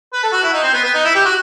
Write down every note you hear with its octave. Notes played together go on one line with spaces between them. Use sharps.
B4
A4
F#4
E4
D#4
C4
B3
B3
D#4
E4
G4
F#4